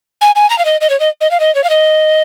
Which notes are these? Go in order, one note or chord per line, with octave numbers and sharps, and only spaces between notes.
G#5
G#5
A#5
F5
D#5
D#5
C#5
D#5
D#5
F5
D#5
C#5
F5
D#5